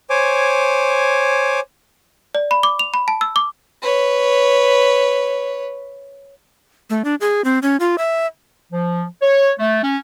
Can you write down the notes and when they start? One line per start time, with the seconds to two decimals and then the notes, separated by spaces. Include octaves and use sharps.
0.10 C5 C#5 G#5 D6
2.35 D5
2.51 B5
2.63 D6
2.79 F7
2.94 B5
3.08 A5
3.21 E6
3.36 D6
3.82 B4 C#5
6.90 A3
7.04 D4
7.21 G#4
7.45 C4
7.62 C#4
7.80 F4
7.98 E5
8.71 F3
9.22 C#5
9.59 A3
9.83 C#4